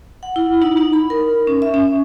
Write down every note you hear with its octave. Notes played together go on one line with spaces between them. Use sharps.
F#5
E4
D#4
D#4
B5
A#4
C#4
E5
C#4